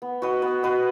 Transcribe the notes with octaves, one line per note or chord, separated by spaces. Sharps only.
B3
F#4 B4 D#5
B3
F#4 B4 D#5